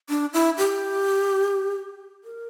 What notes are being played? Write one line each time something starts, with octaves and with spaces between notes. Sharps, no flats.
D4
E4
G4
A#4